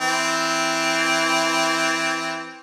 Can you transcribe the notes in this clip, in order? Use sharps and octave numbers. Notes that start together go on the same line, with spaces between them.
E3 C4